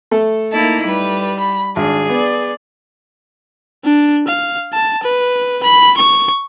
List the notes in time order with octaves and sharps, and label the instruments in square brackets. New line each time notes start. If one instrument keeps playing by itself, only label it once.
[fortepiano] A3 A4
[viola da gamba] A#3 D#4 E4 [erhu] A5
[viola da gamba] G3 [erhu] B4
[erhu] B5
[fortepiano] G#1 [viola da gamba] D4 [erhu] G#4
[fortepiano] B3 [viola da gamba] D5
[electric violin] D4
F5
A5
B4
B5
C#6